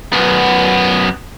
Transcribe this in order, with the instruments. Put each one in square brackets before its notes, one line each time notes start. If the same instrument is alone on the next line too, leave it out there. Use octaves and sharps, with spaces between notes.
[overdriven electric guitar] F#2 B3